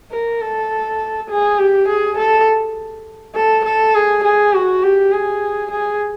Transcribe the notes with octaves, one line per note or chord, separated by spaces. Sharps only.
A#4
A4
G#4
G4
G#4
A4
A4
A4
G#4
G#4
F#4
G4
G#4
G#4